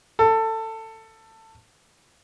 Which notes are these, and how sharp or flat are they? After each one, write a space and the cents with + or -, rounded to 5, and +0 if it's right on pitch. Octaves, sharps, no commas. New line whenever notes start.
A4 +20